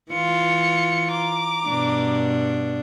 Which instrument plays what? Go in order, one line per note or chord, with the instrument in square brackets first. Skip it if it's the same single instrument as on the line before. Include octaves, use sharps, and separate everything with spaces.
[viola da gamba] E3 F4 [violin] C#7
[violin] A#5 D6
[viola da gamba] G2 B2 D4